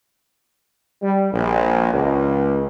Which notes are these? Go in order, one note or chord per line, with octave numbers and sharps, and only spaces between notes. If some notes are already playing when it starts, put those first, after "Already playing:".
G3
A#1
C#2